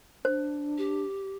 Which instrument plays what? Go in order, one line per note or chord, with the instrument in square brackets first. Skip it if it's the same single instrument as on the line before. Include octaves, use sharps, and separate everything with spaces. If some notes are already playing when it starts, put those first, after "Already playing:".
[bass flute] D4 [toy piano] C5
[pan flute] G4